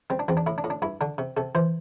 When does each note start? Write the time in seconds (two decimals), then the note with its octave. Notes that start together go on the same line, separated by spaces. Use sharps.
0.10 G3 C4
0.19 D4
0.28 E2 C4
0.37 D4
0.47 A2 E4
0.58 D4
0.64 A2
0.70 D4
0.82 G2 E4
1.01 D3 D4
1.18 C3
1.37 C3 A4
1.55 E3 C5